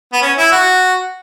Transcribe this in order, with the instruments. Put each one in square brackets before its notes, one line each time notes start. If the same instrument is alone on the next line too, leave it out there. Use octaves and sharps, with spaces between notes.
[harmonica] B3
C#4
E4
F#4